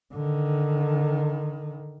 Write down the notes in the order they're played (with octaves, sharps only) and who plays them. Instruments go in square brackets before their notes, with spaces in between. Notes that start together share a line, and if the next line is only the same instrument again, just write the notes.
[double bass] D3 D#3